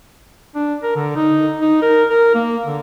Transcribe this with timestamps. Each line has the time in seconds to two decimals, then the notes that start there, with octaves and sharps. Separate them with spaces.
0.55 D4
0.83 A#4
0.96 D3
1.16 D#4
1.61 D#4
1.82 A#4
2.10 A#4
2.35 A#3
2.66 D3